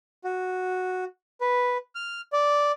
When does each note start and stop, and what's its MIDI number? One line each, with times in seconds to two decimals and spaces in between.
0.24 1.04 66
1.41 1.77 71
1.95 2.21 89
2.33 2.72 74